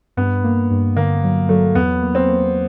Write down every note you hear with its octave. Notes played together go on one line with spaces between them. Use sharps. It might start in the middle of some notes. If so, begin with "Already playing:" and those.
G2 B3
A#3
G2
D3 A#3
F#3
F#3 A3
E2 B3
A#3
C4
A#3